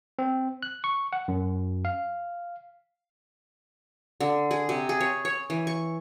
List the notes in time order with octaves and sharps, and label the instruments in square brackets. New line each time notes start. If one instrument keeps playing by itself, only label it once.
[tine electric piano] C4
F#6
C#6
F#5
F#2
F5
[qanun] D3
G#4
C3
G#4
C#5
C#5
E3
C#6